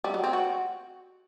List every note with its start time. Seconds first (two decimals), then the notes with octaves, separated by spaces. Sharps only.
0.04 G3
0.14 F#3
0.24 C4
0.33 F#4